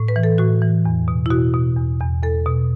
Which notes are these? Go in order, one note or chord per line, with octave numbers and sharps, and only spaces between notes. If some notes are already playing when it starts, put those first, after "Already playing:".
Already playing: A2
B4
E3
A4
A2 F#4
E3
E2
B2
E4
B2 F#4
B2
E2
E2
E2 A4
B2